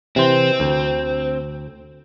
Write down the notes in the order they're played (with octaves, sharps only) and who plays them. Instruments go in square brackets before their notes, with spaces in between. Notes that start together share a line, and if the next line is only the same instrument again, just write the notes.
[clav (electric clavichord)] C3 E3 C5 [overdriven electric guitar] C4
[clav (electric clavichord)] D2